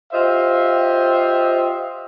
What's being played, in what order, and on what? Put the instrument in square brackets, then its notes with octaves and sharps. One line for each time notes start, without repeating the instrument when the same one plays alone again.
[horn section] F4 G4 C5 D#5 E5